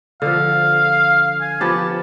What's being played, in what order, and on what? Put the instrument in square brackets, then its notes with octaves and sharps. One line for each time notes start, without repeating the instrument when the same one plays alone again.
[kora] D3 F3 [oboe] F5
[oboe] G#5
[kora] F3 B3 G4 [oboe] A5